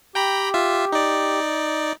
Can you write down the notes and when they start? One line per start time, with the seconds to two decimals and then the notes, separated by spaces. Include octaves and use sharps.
0.15 G4 G5 A#5 B5
0.54 F4 E5
0.92 D#4 D5